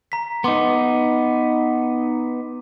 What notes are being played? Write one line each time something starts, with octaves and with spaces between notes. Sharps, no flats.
A#5 B6
B3 D#4 C6 D6